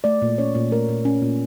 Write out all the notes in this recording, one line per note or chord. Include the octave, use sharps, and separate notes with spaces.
A3 D5
A#2
C#4 C#5
A#2
A3 A#4
A#2
C#4
A#2